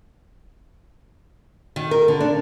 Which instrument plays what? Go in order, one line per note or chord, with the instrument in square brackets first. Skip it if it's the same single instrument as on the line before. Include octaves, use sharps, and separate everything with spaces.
[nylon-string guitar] D#3
A#4
D3
D4